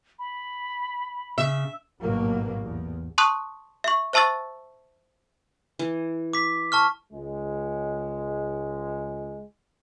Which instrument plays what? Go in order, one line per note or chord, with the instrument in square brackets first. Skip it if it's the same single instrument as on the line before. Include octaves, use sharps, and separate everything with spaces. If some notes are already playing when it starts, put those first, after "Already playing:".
[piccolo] B5
[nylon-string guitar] C#3 [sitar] E5
[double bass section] A1 G#2 B2 F#3 A#3
E2
[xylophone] A5 C6 C#6 D#6 F#6
E5 C#6
C5 E5 A5 C#6 E6 A6
[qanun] E3
[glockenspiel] D6 B6
A5 C#6 F6
[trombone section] C#2 G#3